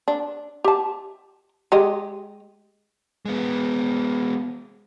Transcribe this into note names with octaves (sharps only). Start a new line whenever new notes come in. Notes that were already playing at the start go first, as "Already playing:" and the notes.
D4
G4 A5
G#3 G4 D#5
G#3 B3